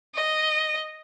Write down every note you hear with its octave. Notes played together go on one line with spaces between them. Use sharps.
D#5